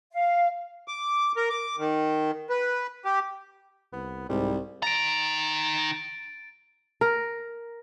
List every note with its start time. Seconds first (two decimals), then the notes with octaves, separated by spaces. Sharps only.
0.13 F5
0.88 D6
1.37 A#4
1.50 D6
1.78 D#3
2.50 B4
3.05 G4
3.93 C2 B3
4.29 C2 G#2 G3
4.83 D#3 A#5 A6 D7
7.01 A#4